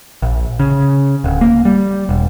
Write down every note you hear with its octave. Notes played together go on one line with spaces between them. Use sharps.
A#1
C#3
D1
A#3
G3
E1